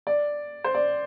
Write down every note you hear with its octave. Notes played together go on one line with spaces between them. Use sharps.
D5
C5
D5